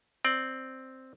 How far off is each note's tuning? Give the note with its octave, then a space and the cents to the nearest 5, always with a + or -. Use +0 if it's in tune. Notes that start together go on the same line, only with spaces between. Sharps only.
C4 +0 D5 +10